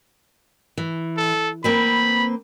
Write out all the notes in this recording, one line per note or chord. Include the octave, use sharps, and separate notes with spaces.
E3
A4
A#3 C4 B4 B5